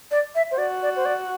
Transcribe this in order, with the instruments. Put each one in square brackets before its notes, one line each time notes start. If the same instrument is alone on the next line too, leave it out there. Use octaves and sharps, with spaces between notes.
[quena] D5
E5
C5
[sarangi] F#4 [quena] D5
[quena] D5
C5
D5